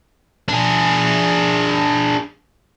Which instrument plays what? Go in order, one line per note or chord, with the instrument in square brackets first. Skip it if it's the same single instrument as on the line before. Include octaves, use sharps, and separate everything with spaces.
[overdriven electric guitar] D4 G#4